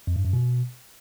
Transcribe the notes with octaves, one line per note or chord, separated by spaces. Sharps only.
F2
G2
F#2
B2